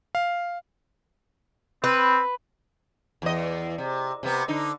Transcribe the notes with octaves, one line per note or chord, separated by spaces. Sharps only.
F5
C4 B4
E2 D#5
C3
C3 B3
D3 D#4